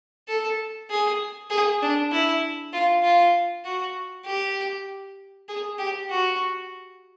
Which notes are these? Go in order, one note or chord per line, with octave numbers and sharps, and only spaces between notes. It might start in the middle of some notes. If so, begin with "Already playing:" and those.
A4
G#4
G#4
D4
E4
F4
F4
F#4
G4
G#4
G4
F#4